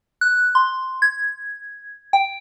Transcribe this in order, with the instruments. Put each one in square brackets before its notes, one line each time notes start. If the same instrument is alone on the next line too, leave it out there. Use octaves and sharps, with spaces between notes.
[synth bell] F#6
C6
G#6
G5